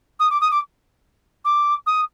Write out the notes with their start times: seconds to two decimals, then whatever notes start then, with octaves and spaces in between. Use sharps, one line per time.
0.20 D#6
0.31 D6
0.41 D#6
0.52 D6
1.45 D6
1.87 D#6